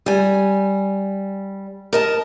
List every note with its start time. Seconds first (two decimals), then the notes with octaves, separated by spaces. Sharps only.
0.06 G3 G#5
1.93 A#4 D#5 A5